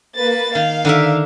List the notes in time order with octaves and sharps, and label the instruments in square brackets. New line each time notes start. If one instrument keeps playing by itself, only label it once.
[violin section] A#3 B4 A6
[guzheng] D#3 [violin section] F5
[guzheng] D3 A#4 E5 [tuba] D#3